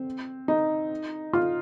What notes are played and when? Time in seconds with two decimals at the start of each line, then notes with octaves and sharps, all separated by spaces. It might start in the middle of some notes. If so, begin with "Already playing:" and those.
Already playing: C4
0.48 D#4
1.33 F4